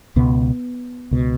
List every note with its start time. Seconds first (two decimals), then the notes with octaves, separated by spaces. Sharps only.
0.16 C#2 B2 B3
1.11 C#2 B2